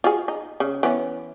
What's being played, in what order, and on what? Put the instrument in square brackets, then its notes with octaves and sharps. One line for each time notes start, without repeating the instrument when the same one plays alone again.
[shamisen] F4 F#4 G#4
D#4
C#3
E3 B3 C#4